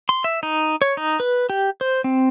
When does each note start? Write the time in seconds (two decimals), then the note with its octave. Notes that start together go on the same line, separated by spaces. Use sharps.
0.09 C6
0.24 E5
0.43 D#4
0.82 C#5
0.97 D#4
1.20 B4
1.50 G4
1.81 C5
2.04 C4